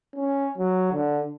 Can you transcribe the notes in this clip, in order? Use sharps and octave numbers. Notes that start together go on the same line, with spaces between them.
C#4
F#3
D3